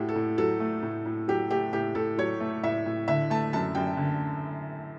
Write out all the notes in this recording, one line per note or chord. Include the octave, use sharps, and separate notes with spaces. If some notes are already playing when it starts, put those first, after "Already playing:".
Already playing: A2 A3 F#4 G4
A4
A2
F#3 A4
A3
A2
A2
F#3 G4
A3 G4
A2 G4
A2 A4
F#3 C#5
A3
A2 E5
A2
D3 E5
A3 A5
F#2 A5
F#2 G5
D3